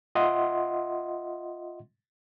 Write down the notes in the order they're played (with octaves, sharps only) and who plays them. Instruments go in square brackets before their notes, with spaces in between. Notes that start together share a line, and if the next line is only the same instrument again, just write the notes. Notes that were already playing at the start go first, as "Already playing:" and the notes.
[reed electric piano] F4 D#5 E5 F#5 C6